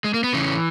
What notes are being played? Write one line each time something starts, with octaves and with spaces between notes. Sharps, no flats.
G#3
A#3
B3
C#3 E3 C#4